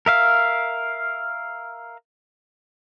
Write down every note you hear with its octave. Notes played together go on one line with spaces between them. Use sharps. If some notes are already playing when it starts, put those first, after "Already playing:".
A#4 E5 F5